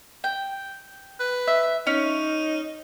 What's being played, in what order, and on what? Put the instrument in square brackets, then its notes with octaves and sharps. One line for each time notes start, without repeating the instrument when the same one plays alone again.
[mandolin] G5
[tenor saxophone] B4
[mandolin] E5
[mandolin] C#4 [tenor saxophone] D#4